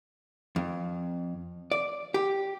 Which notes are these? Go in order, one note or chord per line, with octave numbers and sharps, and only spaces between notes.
F2
D5
G4